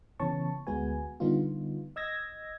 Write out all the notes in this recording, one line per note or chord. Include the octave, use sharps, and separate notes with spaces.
C#3 E3 B3 C#5 A5 C#6
D2 G#3 B3 F#4 B4 G#5
D3 G3 B3 D#4 F4
D#5 E6 G#6 A#6